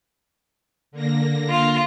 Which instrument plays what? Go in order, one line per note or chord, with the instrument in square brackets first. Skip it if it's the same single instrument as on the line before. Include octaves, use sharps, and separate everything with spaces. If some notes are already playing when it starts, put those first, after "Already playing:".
[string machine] D3 A#3 A#6
[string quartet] F4